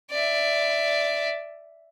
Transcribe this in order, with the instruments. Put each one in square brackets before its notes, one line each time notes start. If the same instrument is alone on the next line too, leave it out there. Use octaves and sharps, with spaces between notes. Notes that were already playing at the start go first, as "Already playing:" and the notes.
[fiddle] D5 E5